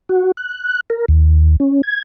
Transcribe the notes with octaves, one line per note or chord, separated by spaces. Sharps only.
F#4
F#6
A#4
D#2
C#4
G#6